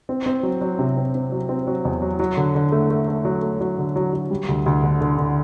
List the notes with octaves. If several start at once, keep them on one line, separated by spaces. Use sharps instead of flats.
C4
C4
F#3
F#3
C3
C4
C4
F#3
C4
F#3
E2
F#3
F#3
D3
D3
A3
A3
A3
F#3
A3
F#3
D3
F#3
F#3
G3
D2
D2
D3
D3
D3